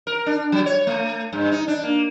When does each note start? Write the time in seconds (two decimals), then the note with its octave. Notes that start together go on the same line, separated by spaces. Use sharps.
0.07 A#4
0.26 D4
0.52 F#3
0.66 C#5
0.87 A3
1.33 G2
1.51 D#4
1.68 D4
1.84 A#3